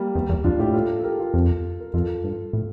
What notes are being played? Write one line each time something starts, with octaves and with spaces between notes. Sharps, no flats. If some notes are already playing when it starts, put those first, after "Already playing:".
Already playing: G3 A#3
E2
E2
F2 D4 F4
A2 E4 G4
F4 A4
A4
G4 A#4
F4 A4
F2
A#4
F2 F4 A4
G2
A2